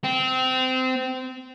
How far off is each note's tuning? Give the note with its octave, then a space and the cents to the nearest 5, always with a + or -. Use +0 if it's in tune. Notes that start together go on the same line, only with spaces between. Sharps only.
C4 -20